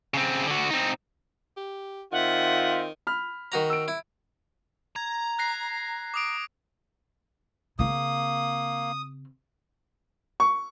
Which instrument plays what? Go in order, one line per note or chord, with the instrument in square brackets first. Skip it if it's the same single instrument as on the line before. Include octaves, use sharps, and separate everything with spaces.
[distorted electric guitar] C#3 C4
D3 F#4
C4 D#4
[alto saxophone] G4
[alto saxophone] D#3 [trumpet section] C4 F4 [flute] E5 [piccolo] F#5
[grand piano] B5 F6
[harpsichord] D#3 F#4 A#5
[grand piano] E6 D7
[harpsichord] E4
[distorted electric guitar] A#5 [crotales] G#6
[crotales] F#6 A#6 C7
D6 D#6 D7
[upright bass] C#3 C4 [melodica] A#3 [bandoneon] D#6
[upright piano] C#6